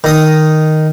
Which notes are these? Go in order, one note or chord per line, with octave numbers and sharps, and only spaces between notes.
D#3 D#5 D#6